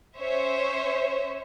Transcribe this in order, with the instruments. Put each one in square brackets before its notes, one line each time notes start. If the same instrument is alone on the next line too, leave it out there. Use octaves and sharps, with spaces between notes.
[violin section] C#4 C5 C#5 E5